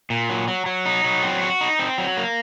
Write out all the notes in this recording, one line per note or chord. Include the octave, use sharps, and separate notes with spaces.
A#2
F#3
F#3
F#3
D#4
F#3
C4
F#4
D#4
C4
F#3
A#3